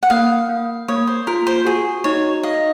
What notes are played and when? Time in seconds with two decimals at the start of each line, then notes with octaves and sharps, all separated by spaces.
0.03 F#5
0.10 A#3 F5
0.49 A#3
0.88 A#3 C#5
1.07 C5
1.27 F4 A#4
1.47 C5
1.65 F#4 G#4
2.04 D#4 C#5
2.43 D#5 F5